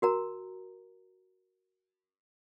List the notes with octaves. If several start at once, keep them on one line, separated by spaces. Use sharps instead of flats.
F#4 A#4 A#5